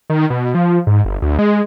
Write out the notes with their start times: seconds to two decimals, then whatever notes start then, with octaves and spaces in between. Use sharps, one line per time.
0.10 D#3
0.30 B2
0.55 F3
0.87 G#2
1.05 G1
1.22 D2
1.39 G#3